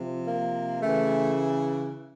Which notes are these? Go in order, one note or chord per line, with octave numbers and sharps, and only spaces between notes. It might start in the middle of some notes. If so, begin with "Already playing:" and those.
Already playing: C3 F3
A#3
C#3 E3 A3